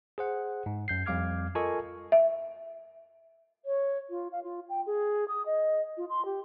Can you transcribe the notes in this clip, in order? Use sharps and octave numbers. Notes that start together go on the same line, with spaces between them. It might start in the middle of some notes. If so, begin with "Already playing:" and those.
G#4 C5 F#5
G#2
F#2 G6 C7
F2 G3 F5 D6 F6 G#6
F4 A4 A#4 D#5 G#5 C#6
E5
C#5
F4
F5
F4
G5
G#4
D#6
D#5
F4
C6
G4